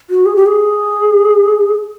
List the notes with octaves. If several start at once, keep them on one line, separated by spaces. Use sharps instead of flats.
F#4
G#4
G4
G#4